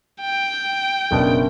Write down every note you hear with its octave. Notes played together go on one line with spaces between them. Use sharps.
G5
F#1 B2 D4